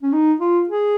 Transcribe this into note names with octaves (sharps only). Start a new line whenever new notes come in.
C#4
D#4
F4
G#4